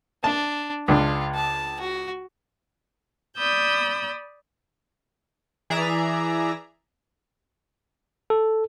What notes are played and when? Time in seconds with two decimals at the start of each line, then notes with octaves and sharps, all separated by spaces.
0.24 D4 A5
0.88 C#2 D4 F4
1.35 A5
1.80 F#4
3.36 D5 B5 D#6 E6 G6
5.70 E3 G#4 D5 E5 A#5
8.30 A4